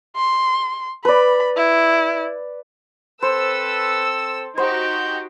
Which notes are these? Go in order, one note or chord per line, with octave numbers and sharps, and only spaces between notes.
C6
B4 D5 B5
E4
C4 A4 B4 C5 E6
D#4 F#4 G4 C5 G6